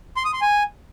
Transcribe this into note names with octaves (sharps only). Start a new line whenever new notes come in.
C6
D#6
C6
G#5